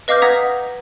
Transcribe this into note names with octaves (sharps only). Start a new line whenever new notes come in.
B4 D#5 F5 D6 F6 G6
F#5 A#5 D#6 G#6 A#6 B6